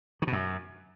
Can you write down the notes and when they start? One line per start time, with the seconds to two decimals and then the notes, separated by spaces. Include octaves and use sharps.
0.22 D#3
0.27 B2
0.33 F#2